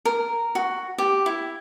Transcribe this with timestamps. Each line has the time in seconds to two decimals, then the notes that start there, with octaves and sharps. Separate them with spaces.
0.05 A#4
0.55 F#4
0.98 G4
1.26 E4